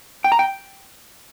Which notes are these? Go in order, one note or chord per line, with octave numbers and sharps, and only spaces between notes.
G5
A#5
G5